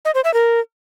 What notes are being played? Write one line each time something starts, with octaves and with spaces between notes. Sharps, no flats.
D#5
C5
E5
A#4